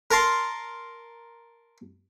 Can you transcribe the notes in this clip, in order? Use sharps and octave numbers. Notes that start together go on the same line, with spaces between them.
A#4 A5 C6